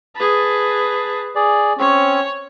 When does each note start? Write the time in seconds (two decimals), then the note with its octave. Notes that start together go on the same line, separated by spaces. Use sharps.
0.15 G#4 B4 A5
1.35 G#4 D5
1.79 C4 C#4 C#5